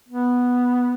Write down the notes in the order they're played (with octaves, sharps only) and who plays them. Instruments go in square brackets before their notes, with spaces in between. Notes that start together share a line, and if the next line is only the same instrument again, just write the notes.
[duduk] B3